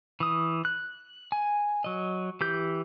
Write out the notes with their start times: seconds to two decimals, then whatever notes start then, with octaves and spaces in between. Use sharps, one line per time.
0.20 E3 D#6
0.65 F#6
1.32 G#5
1.84 F#3 D#5
2.41 E3 G4 G6